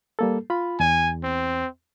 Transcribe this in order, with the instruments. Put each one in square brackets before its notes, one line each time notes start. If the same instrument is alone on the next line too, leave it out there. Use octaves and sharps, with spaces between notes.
[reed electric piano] G3 A#3 A4
F4 B5
[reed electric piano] E2 [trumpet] G#5
[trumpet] C4